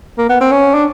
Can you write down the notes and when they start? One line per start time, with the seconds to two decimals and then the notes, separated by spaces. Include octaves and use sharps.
0.18 A#3
0.29 B3
0.41 C4
0.52 C#4
0.75 D4